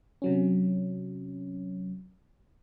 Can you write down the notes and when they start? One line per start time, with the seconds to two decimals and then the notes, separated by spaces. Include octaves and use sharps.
0.22 C3 F#3 C#4